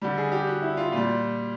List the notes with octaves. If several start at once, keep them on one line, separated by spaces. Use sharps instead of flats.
D3 G3
G#4
G4
F#4
E4
F4
A#2 G3 F4